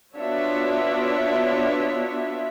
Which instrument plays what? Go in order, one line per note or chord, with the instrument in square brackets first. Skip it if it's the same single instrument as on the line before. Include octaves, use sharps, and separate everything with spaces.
[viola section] B3 D4 F4 F#4 C#5 E5